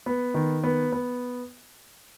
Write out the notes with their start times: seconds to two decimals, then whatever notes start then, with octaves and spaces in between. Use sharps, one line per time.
0.06 B3
0.34 D#3
0.64 B3
0.92 B3